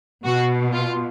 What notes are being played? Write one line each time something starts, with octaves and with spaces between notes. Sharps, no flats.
B2 F#4
F4